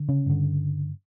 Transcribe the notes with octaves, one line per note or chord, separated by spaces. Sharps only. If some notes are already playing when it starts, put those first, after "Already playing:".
Already playing: D3
C#3 C#4
G2 D3